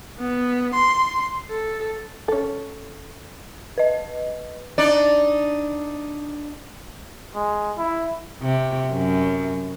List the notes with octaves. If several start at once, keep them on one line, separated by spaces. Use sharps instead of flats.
B3
C6
A4
C#4 A4
B4 D#5
D4 D#4 D5
G#3
E4
C3
F#2